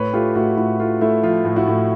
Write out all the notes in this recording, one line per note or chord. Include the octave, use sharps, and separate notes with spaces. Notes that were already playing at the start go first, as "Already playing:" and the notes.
Already playing: A2 B4 C#5
A3 F4 G4
A2 E4 F#4
A2 E4 F#4
A3 F4
A3 E4
F3 F4
A2
E4 F#4
A2